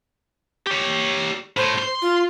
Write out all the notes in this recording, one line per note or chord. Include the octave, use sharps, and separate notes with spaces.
G4 C#5
A2 C5
C6
F4